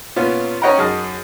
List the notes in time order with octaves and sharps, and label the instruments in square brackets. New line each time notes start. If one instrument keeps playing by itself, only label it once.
[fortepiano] A#2 B3 C#4 F4
C#4 C#5 D#5 F#5 G5 A#5
F#2 F#4 G#4 D#5 A5 F6